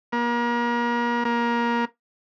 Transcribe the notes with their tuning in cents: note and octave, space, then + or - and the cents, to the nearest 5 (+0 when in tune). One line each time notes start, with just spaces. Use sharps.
A#3 +35
A#3 +20